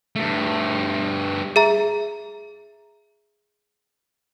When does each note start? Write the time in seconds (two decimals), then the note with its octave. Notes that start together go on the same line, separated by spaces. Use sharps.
0.16 G2 A3
1.56 G#4 E5 A#5